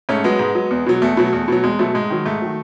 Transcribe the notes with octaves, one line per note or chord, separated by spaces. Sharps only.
G#2 A3 C#4
F#3 G#3 B3
G#2
F#3
E2
B2 F#3
E2 A3
B2 F#3
E2
B2 F#3
E2 G#3
B2 F#3 A3
G#2 G#3
D#3 F#3
G#2 A3
D#3 F#3